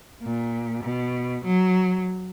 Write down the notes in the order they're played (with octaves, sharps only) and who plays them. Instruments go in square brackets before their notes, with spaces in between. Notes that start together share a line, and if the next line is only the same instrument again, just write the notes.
[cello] A#2
B2
F#3